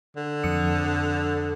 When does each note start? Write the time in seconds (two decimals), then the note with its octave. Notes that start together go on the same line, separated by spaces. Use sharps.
0.17 D3
0.44 F2 D#6 C#7